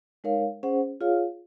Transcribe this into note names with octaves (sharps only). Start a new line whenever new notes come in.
G#3 D#4 A#4 C#5 F5
C#4 G#4 C5 F#5
F4 G#4 C#5 F5